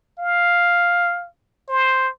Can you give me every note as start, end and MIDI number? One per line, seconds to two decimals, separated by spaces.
0.19 1.27 77
1.69 2.09 72